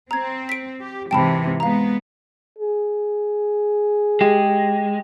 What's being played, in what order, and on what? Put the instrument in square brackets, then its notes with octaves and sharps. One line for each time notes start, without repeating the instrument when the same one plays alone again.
[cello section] C4 [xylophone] A#5 G#6
[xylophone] B6 D7
[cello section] G4
[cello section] G#2 C3 E3 [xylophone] G5 A5 B5
[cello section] G#3 B3 [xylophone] F5 A#5
[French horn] G#4
[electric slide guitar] G#3 [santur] G4